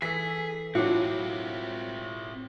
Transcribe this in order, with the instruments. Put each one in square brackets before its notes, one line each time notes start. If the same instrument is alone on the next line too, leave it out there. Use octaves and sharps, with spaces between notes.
[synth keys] E3 A4 [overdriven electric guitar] G#4 [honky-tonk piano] B6
[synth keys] A2 [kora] F#3 D4 F#5 [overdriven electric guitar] C4 E4 [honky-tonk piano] F4